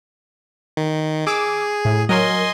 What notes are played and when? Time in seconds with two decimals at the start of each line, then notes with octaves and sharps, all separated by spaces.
0.77 D#3
1.27 G#4 D6 E6
1.85 A2
2.09 F#3 A#4 D#5 G#5 C6